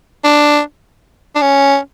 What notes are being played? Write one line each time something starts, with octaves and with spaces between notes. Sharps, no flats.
D4
D4
C#4